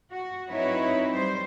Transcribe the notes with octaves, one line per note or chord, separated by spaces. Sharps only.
F#4
F#3 C4 D#4 E4 B4 C#5
G3 C5